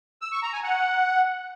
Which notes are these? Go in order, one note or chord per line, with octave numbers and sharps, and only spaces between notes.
E6
C#6
A#5
G#5
F#5